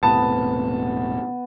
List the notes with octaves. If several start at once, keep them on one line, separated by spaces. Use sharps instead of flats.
E1 A2 C3 B3 A5